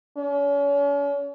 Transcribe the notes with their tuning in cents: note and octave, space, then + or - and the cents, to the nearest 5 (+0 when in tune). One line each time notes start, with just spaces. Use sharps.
C#4 +40